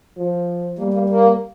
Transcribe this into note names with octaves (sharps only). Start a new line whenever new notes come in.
F3
G3 A#3
A#3
A#3